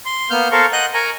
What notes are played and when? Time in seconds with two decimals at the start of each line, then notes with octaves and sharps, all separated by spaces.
0.06 C6
0.30 A#3 B3 F6 G6
0.52 A4 A#4 C5 F5 C#6
0.73 D#5 F#5 F#6 G6
0.94 A#4 G#5 A#5 C#6